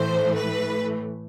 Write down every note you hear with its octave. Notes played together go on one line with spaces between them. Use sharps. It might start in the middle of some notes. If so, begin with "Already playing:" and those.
Already playing: A2 E3 A3 C5
B4